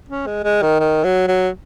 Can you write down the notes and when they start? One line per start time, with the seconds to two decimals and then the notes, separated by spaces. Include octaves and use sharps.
0.09 C#4
0.26 G#3
0.44 G#3
0.62 D#3
0.80 D#3
1.04 F#3
1.27 F#3